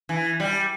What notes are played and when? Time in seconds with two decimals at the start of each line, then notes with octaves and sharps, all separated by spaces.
0.09 E3
0.40 G3